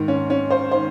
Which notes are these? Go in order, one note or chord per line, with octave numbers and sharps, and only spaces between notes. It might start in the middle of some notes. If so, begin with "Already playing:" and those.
Already playing: G#2 D#3
C#4
C#4
C5
D#3 C5